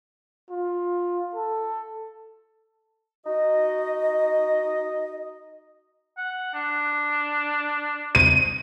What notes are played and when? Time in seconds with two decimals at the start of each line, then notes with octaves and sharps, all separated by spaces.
0.51 F4
1.35 A4
3.25 D#4 F#4 D#5
6.17 F#5
6.54 D4
8.15 D#7